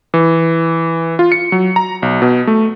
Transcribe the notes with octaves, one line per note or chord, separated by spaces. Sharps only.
E3
F4
C#7
F#3
A#5
B1
B2
A3